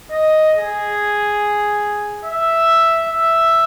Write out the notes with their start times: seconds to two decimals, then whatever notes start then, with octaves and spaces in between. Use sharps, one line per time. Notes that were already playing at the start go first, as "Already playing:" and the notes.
0.11 D#5
0.54 G#4
2.25 E5
3.09 E5